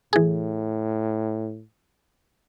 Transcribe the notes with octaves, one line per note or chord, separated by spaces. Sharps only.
A2 E3 G#4